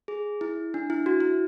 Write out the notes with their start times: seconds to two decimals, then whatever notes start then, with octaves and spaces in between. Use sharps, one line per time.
0.08 G#4
0.41 E4
0.74 D4
0.90 E4
1.06 F#4
1.20 E4